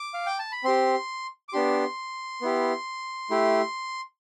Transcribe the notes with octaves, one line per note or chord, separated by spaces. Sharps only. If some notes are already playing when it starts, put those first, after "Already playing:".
Already playing: D6
F5
G5
A5
B5
C4 G4 C6
D6
B3 D4 G4 C6
B3 E4 G4
A3 E4 G4